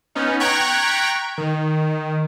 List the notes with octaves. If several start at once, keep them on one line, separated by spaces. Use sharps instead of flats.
B3 C#4 D#4
G5 A#5 C#6 F#6 G#6 B6
D#3